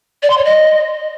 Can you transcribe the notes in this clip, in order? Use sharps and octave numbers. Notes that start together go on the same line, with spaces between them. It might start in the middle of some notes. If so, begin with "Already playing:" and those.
D5
C6
C#5
D#5